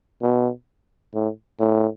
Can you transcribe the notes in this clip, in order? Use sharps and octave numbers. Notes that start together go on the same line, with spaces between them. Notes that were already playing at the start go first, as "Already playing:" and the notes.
B2
A2
A2